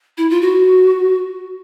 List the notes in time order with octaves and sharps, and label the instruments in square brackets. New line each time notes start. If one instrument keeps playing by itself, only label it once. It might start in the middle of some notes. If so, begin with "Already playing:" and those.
[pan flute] E4
F4
F#4